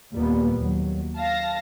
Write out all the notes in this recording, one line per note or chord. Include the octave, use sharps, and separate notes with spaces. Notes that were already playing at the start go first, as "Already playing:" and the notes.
D#2 A#2 G3 B3
D#2 F#3
F5 A5 A#6